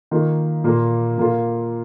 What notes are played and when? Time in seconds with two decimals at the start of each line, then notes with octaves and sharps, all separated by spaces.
0.11 D#3 A#3 F4
0.64 A#2 A#3 F4
1.18 A#2 A#3 F4